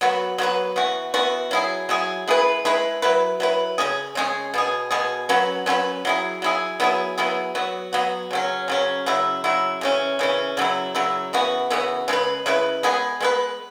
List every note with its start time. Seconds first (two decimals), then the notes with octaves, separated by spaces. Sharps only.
0.01 F#3 B3 F#4 B4
0.38 F#3 B3 F#4 B4
0.76 E3 B3 F#4
1.14 E3 B3 F#4
1.51 F#3 E4 G#4
1.89 F#3 E4 G#4
2.27 G#3 E4 G#4 B4
2.65 G#3 E4 G#4 B4
3.02 F#3 E4 B4
3.40 F#3 E4 B4
3.78 C#3 G#3 C#4 G#4
4.15 C#3 G#3 C#4 G#4
4.54 B2 B3 G#4
4.91 B2 B3 G#4
5.29 F#3 C#4 F#4 B4
5.66 F#3 C#4 F#4 B4
6.05 F#3 E4 G#4
6.42 F#3 E4 G#4
6.80 F#3 B3 E4 G#4
7.18 F#3 B3 E4 G#4
7.55 F#3 B3 F#4
7.93 F#3 B3 F#4
8.31 C#3 F#3 C#4
8.68 C#3 F#3 C#4
9.06 C#3 F#3 E4
9.44 C#3 F#3 E4
9.81 C#3 E3 C#4
10.19 C#3 E3 C#4
10.57 C#3 F#3 E4
10.95 C#3 F#3 E4
11.33 C#3 E3 B3 F#4
11.70 C#3 E3 B3 F#4
12.08 C#3 G#3 E4 B4
12.46 C#3 G#3 E4 B4
12.83 G#3 B3 G#4 B4
13.20 G#3 B3 G#4 B4